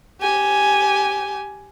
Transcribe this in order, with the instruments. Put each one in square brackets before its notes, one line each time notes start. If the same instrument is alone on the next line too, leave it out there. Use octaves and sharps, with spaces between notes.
[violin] G4 G#5